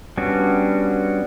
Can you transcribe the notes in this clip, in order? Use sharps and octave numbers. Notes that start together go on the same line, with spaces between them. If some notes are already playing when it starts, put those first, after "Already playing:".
G3 B3 C#4 D4 F#4